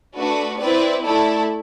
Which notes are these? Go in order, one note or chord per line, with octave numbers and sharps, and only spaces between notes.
A3 D4 F#4 B4
C4 E4 B4 D5
A3 E4 A4 D5